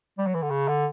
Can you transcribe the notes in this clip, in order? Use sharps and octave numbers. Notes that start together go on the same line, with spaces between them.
G3
F#3
E3
D3
C#3
D3